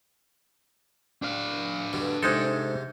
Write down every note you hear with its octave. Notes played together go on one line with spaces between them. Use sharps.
D4 F5
G2 B2 D3
G#2 C3 G#3 D#4 A4 C6